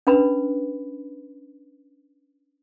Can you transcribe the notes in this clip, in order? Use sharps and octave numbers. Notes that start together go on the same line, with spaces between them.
C#4 D4 B4 B5